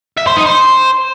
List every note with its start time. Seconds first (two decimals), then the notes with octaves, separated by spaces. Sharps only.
0.18 E5
0.27 C5
0.36 D#4
0.46 C5